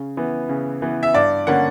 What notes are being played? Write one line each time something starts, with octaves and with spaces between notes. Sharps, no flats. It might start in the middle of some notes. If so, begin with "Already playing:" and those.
Already playing: C#3
E3 B3
C#3
E3 B3
E5
G2 D5
D3 A#3 C#4 F#5